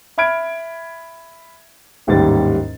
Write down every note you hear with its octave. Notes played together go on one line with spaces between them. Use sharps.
E5 B5 F6 G#6 D7
A1 D#2 G#2 G3 G4 A6